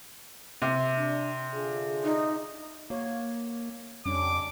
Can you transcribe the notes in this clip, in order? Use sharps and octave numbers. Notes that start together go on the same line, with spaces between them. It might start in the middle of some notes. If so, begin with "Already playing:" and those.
C3
D4
D3 F4 G#4
D#4
A#3 F#4 C#5
F2 G3 C#4 D4 D6